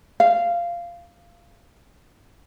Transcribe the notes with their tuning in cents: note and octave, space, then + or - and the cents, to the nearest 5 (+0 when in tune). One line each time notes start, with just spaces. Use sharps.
F5 -15